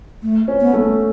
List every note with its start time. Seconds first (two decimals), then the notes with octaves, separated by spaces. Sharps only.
0.23 A3
0.48 C#4
0.61 B3
0.73 A3